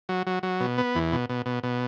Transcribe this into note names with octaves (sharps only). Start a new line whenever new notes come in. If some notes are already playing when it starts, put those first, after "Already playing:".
F#3
F#3
F#3
B2
B3
E2
B2
B2
B2
B2